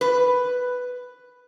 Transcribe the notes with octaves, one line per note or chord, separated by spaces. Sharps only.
B4